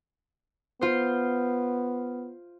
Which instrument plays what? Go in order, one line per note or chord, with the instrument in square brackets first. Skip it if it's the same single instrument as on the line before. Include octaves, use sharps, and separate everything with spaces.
[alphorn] B3 [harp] F4 C5